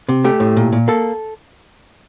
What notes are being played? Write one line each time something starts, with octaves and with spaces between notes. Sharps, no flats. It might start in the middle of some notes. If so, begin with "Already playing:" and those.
C3
A3 G4
A2
A#2
A#2
A#3 A4